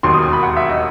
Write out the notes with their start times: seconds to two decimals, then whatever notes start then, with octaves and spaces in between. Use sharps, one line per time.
0.03 E1 D#2 D#3 F#3 C6
0.13 D#6
0.22 C6
0.33 B5
0.43 F#5
0.57 E5
0.70 D#5